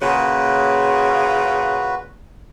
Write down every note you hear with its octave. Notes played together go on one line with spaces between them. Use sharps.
A#2 C#3 F#4 B4